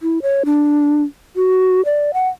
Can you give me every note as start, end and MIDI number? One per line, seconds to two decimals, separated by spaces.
0.02 0.19 64
0.22 0.43 73
0.45 1.03 62
1.36 1.84 66
1.85 2.11 74
2.14 2.29 78